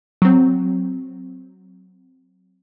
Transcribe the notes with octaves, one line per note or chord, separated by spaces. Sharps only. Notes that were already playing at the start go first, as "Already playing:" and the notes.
F#3 C4